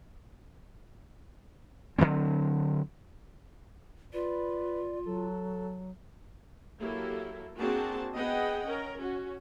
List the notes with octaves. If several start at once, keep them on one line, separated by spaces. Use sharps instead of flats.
D3 F3 F#3 C4
F4 B4 D5
F#3 A4
F#3 A#3 E4 G4 A4
A#3 C4 D4 F#4 G#4 A5
B3 G#4 D#5 F#5 G5
C#4 A#4
C#4 F#4